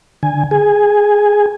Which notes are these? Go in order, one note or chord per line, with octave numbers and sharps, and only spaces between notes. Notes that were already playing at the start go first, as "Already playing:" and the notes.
D3 G#5
G#4 G#5